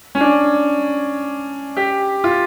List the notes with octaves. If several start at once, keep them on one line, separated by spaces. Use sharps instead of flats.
C#4
D4
G4
F4